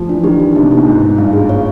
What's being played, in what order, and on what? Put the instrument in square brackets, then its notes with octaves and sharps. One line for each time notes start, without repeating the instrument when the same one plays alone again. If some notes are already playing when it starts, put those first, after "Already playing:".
Already playing: [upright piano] F3 A3
[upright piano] E3 [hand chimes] D4
[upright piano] D#3 [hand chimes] G4
[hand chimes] D4
[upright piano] C3 [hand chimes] D#4
[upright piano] B2
[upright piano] A#2 [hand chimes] D#4
[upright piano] B2
[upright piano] G#2 [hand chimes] D#4
[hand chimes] D#4
[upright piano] G2 [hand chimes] F5
[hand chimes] G#4
C#5